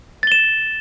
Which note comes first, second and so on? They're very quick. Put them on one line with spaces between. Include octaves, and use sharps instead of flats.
A6 G7 E7